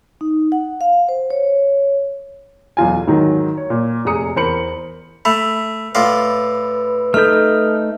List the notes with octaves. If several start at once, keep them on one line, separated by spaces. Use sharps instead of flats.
D#4
F#5
F5
C5
C#5
B1 E2 F4 G#5
G#2 D#3 F#3
C#5
A#2
F1 G#4 A#5 D#6 C#7
E2 A#4 C5 B5 C#7 F#7
A3 B5
A2 F4 B4 D5
A3 D#4 A4 F6 G6